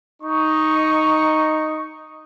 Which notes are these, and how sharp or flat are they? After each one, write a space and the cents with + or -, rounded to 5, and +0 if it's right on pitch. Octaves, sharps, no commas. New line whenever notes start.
D#4 +0 C#6 +0